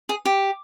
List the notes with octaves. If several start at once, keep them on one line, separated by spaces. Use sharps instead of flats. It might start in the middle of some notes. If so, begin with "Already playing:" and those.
G#4
G4